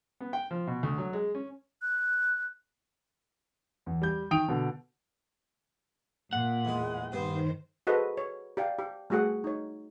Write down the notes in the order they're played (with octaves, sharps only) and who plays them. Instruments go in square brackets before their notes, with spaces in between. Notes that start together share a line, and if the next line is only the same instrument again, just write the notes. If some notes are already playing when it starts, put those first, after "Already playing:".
[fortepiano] B3
G5
F3
B2
D2
F#3
G#3
C#4
[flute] F#6
[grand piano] E2
G3 G6
D#3 G5 D#6 D7 F7
B2 D3
[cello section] A#2 [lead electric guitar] F#5
[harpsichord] E2 G#3
[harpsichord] G2 B3 [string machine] D#3 [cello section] C5
[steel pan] F#4 G#4 A4 B4 C5 D#5
C#5
G4 D5 F5 G5
G4
G3 A3 F#4 G#4 F#5
D#4 C#5